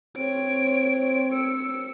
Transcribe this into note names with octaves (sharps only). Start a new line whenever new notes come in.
C4 C#5 D7
E6 C#7